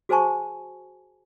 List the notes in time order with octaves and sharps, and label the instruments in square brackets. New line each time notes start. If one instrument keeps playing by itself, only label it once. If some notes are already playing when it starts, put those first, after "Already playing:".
[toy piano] F#4 G#4 C5 G#5 A5 C#6